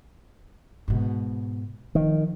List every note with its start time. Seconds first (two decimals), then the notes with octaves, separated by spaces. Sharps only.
0.88 G#2 B2
1.95 D#3 F3